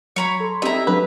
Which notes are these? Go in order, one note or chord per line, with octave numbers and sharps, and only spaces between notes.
F#3 C#5 A#5 B5
A4 C6
C4 D#4 E4 G4 A4 E5 A#5
F#3 D4 B4